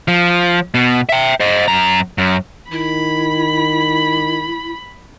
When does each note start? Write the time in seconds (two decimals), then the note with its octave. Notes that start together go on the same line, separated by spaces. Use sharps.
0.08 F3
0.74 B2
1.09 E5 G5
1.40 C5 D#5
1.68 F#2 A#5
2.18 F#2
2.71 D#3 E4 B5